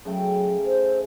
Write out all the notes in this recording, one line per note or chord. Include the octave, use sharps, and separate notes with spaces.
C#3 F#3 A3 G5
C5